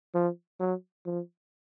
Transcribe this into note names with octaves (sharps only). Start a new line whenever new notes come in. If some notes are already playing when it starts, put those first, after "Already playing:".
F3
F#3
F3